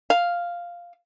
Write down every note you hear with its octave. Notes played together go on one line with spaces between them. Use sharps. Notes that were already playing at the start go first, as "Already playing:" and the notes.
F5